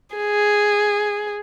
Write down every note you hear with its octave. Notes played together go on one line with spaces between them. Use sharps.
G#4